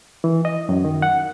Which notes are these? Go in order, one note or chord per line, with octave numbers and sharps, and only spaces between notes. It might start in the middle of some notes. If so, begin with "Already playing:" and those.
E3
D#5
F#2
D#3
F#5